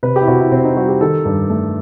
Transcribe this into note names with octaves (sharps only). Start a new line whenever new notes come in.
C3 B4
G4
E4
C3 F#4
E4
C3 C4
D#4
G3 F#4
G4
D#3 A4
G2
A3